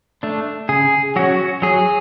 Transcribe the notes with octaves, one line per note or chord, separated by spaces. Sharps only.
A3 D4
C#3 G#4
F#3 C#4 F#4
F#3 G#4